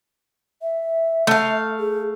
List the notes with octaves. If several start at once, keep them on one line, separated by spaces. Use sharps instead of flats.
E5
A3 F5
G#4